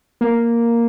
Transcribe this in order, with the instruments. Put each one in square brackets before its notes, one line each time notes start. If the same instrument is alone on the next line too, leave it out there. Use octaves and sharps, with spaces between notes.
[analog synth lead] A#3